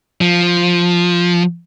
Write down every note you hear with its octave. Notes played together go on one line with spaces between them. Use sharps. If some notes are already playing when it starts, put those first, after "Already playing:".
F3